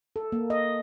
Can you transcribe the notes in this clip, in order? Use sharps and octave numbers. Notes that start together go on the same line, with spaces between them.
A4
A#3
D#5